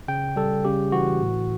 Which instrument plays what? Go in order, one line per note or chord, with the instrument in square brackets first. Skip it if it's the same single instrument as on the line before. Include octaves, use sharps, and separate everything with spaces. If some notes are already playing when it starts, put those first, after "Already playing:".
[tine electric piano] C#3 G5
G3 A4
C#3 G4
E3 F#4
A2